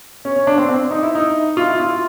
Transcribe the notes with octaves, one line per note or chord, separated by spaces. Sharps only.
C#4
C#4
D4
C4
C4
D#4
E4
D#4
F4
E4
F4